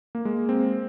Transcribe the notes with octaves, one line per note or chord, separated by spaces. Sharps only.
A#3
G#3
C4